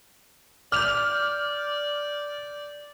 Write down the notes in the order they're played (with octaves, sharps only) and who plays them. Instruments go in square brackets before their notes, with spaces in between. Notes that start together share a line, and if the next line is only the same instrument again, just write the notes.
[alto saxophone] D5 [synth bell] D6 G6 [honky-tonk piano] F6 F7